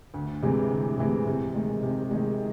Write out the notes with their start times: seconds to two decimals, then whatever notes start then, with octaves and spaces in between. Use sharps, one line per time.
0.14 D2
0.42 C3 E3 G#3
0.71 D2
0.98 C3 E3 G#3
1.27 C3
1.55 D#3 G#3
1.83 C3
2.11 D#3 G#3